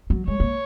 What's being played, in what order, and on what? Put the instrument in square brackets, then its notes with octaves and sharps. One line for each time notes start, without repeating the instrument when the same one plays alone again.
[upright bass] F#3
[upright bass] G#3 [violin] C#5
[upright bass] A#3